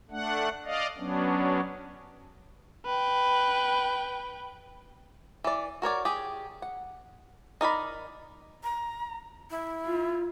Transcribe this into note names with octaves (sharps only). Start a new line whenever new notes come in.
A3 D4 F#5
D5 D#5 F5
F#3 B3 C#4 D4
B4 G5
E3 D5
F#4 A#4 C#5 D5
G4 G#4
F#5
D#4 A#4 D5 B5
A#5
E4
F4